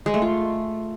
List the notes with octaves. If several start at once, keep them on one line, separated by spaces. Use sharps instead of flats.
G#3
A3
F4